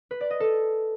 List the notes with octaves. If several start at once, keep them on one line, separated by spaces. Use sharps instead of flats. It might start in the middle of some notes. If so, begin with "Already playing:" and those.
B4
D5
D#5
A4